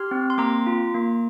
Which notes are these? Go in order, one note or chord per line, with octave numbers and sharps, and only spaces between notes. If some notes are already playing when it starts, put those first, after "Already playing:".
Already playing: G4 C6 F6
C4
C6
A#3 A#5 D6
F4
A#3